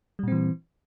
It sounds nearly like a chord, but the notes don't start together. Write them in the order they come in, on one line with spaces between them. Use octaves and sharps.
G3 A#2 C4 E3